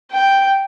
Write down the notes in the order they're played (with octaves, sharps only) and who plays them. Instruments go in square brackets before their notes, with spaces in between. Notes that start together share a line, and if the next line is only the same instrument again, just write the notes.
[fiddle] G5